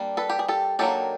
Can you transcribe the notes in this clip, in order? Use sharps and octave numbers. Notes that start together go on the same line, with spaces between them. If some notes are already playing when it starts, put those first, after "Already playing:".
Already playing: G3 A#3 D4
A4 B4
G4
G#4
G4 A4
D#3 F#3 A#3 D4 G4 A4